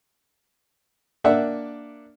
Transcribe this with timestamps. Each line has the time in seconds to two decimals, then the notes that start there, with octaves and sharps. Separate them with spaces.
1.24 A#3 D4 D5 E5 F#5